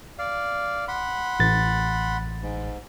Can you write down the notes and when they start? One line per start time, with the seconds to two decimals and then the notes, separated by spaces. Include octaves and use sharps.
0.19 D5 F5
0.88 F#5 B5 C6
1.40 A1 A6
2.42 G#2